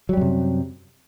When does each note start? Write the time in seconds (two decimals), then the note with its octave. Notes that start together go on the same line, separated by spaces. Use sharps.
0.09 F#3
0.13 G3
0.17 F#2
0.21 C3